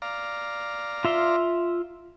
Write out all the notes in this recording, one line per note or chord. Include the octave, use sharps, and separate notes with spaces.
D5 F5 A#5
F4 E5 C6